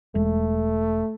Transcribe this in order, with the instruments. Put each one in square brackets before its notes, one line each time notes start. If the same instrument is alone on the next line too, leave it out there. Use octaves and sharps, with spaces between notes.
[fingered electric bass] E1 G#3 [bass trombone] A3